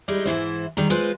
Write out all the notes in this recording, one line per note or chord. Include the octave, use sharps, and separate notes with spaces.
G3 G#3 D#4 E4
G#2 E3 E4 C5
D#3 G3 G#4 A#5
G#3 F4 B4 C5